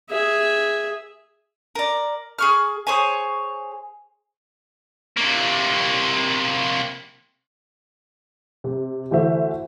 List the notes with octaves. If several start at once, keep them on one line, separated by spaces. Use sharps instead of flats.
G#4 E5
A#4 D5
G#4 C#6 F6
G#4 C5 C#5 G#5
C3 A#3
C3
D2 E3 A3 F#4 C5 E5